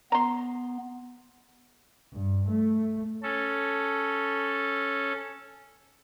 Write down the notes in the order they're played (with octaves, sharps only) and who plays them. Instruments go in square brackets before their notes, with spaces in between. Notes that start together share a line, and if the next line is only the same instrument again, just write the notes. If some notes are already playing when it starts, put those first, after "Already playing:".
[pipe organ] B3 [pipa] A#5 C6
[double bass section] G2
A3
[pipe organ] C#4 A4